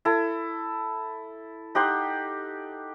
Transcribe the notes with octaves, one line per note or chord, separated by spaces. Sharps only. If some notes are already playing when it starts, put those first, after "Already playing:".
E4 A4
D#4 G4 F#5 C6